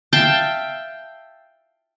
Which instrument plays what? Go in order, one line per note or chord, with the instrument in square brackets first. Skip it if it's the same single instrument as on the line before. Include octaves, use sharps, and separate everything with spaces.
[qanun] E5 F5 G5 A5